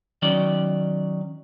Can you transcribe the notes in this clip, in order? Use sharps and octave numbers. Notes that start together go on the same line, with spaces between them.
D#3 F#3 C#4 D5